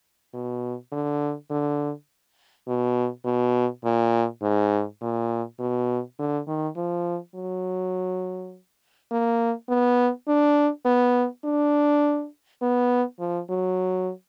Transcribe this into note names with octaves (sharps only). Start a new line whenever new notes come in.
B2
D3
D3
B2
B2
A#2
G#2
A#2
B2
D3
D#3
F3
F#3
A#3
B3
D4
B3
D4
B3
F3
F#3